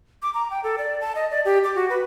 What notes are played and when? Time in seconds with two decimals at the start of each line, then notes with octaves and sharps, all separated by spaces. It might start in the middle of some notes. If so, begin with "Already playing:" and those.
0.22 D6
0.34 A#5
0.50 G5
0.64 A4
0.78 D5
1.01 A5
1.15 D#5
1.31 D5
1.45 G4
1.64 D6
1.75 F#4
1.89 B4